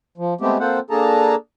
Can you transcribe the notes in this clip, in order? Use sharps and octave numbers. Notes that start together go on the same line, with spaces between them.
F3
G#3 A3 B3 C4 G4
A#3 C4 F4 A4 C5 F#5
A#3 D4 G#4 A4 A5 A#5